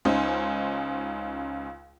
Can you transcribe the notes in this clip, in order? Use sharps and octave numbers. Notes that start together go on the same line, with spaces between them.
C#2 C#4 D#4 C5